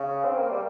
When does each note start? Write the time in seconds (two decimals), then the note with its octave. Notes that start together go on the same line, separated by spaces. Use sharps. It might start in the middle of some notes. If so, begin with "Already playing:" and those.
Already playing: C#3
0.25 C4
0.38 A#3
0.50 G3